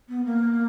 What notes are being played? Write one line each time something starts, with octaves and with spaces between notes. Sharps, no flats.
B3
A#3